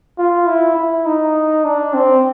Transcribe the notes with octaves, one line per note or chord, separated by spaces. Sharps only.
F4
E4
E4
D#4
D4
C4